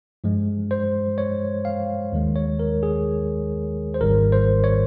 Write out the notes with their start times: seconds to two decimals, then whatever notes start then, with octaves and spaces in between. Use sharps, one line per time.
0.24 G2 F3 G#3
0.71 C5
1.18 C#5
1.65 F5
2.12 D#2 D#3 G#3
2.36 C#5
2.59 A#4
2.83 G#4
3.94 C5
4.01 G#1 G#2 D#3 G3 A#4
4.32 C5
4.64 C#5